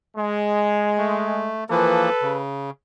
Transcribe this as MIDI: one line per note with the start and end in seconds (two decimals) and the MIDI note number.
0.16 1.49 56
0.98 1.64 57
1.70 2.09 52
1.70 2.09 53
1.70 2.09 58
1.70 2.39 69
1.70 2.39 71
2.22 2.70 49